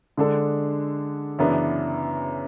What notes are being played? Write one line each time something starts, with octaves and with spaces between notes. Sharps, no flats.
D3 G#3 D4 A4
F#2 C#3 E3 B3 D4